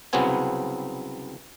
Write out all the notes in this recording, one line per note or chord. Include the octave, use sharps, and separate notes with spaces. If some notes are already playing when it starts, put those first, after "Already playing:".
C2 C#3 F#3 B3 C4 G#5